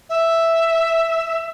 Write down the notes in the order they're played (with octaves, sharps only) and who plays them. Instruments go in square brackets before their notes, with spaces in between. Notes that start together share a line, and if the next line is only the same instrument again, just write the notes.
[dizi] E5